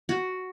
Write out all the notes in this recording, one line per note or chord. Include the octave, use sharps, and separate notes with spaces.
F#4